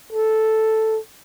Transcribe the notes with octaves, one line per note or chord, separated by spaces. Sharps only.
A4